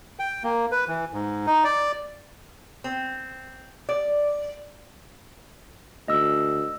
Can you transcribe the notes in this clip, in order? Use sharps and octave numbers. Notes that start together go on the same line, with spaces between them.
G5
A#3
B4
E3
G#2
D#4
D5
C4
D5
D2 D#5 E6